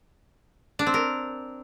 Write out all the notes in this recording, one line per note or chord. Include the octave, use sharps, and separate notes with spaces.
D4
C4
A#4